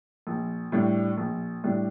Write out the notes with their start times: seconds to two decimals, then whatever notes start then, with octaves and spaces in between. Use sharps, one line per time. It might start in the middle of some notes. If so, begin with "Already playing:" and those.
0.27 A#1
0.72 A2 G3 D4
1.17 A#1
1.64 A2 G3 D4